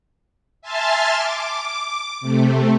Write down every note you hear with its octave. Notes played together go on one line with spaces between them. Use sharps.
E5 G#5 A5 C6 F6 A6
D6
C3 A3